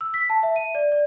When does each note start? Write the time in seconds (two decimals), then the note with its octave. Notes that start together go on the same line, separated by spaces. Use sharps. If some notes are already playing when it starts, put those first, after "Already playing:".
0.01 E6
0.14 B6
0.30 A5
0.43 E5
0.56 D#7
0.75 D5
0.92 D5